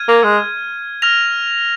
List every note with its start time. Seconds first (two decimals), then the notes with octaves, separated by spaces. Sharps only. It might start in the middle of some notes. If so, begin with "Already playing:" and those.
Already playing: F6 G#6 D#7
0.08 A#3
0.24 G#3
1.02 F6 A#6 F7